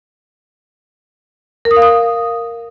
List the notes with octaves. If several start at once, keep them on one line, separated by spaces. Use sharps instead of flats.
A#4
D#6
F5
D#6